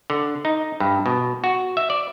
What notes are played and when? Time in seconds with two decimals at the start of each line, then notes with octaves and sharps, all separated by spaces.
0.10 D3
0.45 D#4
0.80 G2
1.06 B2
1.44 F#4
1.77 E5
1.90 D5